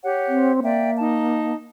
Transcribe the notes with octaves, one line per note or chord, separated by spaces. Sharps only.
G4 C#5 F#5
C4
A#3 D5 E5 G5
D#4 A5